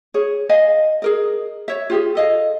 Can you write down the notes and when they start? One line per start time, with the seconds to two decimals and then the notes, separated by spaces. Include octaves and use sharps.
0.14 G#4 C#5
0.49 D#5 F5 G#5
1.02 G#4 A#4 D#5
1.68 C#5 E5
1.90 F4 G4 G#4
2.15 A4 D#5 F5